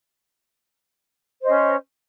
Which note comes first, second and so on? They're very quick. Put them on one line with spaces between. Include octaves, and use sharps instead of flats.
C5 D#5 C#4